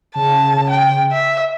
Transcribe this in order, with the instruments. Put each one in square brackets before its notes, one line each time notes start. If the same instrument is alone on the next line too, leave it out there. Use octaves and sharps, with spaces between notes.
[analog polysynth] C#3 [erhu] A5
[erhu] G5
E5